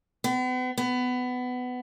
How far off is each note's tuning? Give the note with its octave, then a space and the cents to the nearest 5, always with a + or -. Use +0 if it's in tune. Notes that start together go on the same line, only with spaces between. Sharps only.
B3 +40
B3 +20